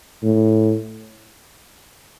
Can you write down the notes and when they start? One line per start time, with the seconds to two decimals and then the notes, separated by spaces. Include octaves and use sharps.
0.23 A2